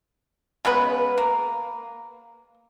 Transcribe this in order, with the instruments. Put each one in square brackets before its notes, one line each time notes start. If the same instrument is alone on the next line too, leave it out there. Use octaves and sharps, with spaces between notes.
[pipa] C#3 G#3 B3 B4
A#3